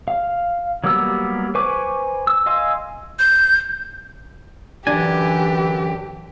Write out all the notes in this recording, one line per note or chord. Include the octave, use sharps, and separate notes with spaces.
F5
F#3 G3 A#3 B3 E6
B4 C5 G#5 C#6 D6
E6
D#5 F5 G#5 C6 E6
G6
F#2 D3 E3 D4 G4 G#5